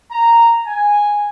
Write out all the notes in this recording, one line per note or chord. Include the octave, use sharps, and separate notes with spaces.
A#5
G#5